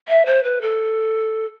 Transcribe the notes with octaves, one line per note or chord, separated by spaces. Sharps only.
E5
C5
B4
A4